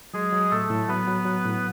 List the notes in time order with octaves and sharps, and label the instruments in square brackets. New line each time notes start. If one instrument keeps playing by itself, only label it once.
[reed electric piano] F#3 [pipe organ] G#3 G#4
[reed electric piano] F#3
[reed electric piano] A2 [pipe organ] A3 A4
[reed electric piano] A2
[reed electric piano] F#3 [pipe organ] B3 B4
[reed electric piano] F#3
F#3
A2